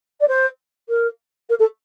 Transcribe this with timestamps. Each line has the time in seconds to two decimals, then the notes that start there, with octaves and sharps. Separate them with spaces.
0.20 D5
0.28 C5
0.89 A#4
1.49 A#4
1.59 A4